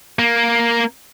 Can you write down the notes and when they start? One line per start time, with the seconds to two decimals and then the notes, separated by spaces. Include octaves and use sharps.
0.19 A#3